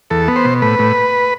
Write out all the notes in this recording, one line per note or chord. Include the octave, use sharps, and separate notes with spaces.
E2 A4
B3
C5
B2
A2 B4
A2